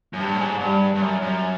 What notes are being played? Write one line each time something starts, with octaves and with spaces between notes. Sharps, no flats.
F#2
G2 G3
A2
G#2
G2 G3
G2
F#2
F#2